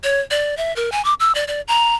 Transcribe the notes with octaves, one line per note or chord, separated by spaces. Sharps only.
C#5
D5
E5
A#4
G#5
D6
E6
D5
D5
A#5